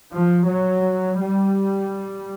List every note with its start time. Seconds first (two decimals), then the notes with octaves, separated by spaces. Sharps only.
0.10 F3
0.47 F#3
1.18 G3